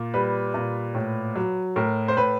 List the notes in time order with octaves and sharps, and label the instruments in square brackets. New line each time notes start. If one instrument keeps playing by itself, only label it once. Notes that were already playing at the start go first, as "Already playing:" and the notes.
Already playing: [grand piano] A#2
G3 B4
A#2
A2
F#3
A2 A#4
C5
A2 B4